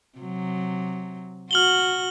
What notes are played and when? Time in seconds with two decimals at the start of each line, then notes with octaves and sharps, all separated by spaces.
0.19 C3 F#3
1.51 F#4 F6 F#7 G7